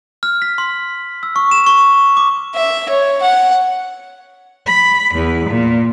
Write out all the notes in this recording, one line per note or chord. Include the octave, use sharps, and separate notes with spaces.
F6
B6
C6
E6
C#6
E7
C#6
D6
E5
C#5
F#5
B5
E2
A#2